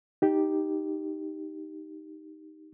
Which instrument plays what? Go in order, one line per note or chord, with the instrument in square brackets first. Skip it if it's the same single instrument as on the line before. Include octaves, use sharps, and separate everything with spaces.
[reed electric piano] D#4 G4